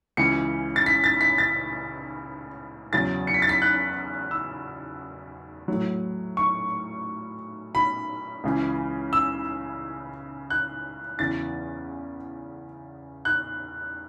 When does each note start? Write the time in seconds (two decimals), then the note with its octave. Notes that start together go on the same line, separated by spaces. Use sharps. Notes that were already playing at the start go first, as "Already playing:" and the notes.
0.17 C#2 C#3 E3 C#7
0.76 A6
0.86 B6
1.04 A6
1.21 B6
1.38 A6
2.93 E2 C#3 F#3 A6
3.27 C#7
3.34 B6
3.42 A6
3.49 B6
3.62 F#6
4.31 E6
5.68 A2 F#3
6.37 C#6
7.75 B5
8.44 C#2 C#3 E3
9.13 E6
10.50 F#6
11.19 E2 C#3 E3 A6
13.25 F#6